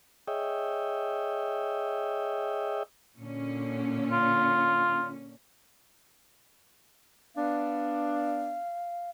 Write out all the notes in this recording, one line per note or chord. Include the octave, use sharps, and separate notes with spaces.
G#4 C#5 D#5 E5 G5
A#2 D3 C#4
F4
B3 D4 F5